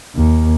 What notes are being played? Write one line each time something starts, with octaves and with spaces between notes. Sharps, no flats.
D#2